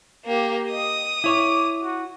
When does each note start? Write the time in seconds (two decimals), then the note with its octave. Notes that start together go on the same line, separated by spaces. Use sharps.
0.25 A#3 G4
0.72 D#5 D#6
1.24 E4 C#5 D6
1.83 F#4